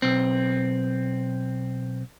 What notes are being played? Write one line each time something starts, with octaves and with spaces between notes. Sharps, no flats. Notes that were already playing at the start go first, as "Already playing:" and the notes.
B1 C4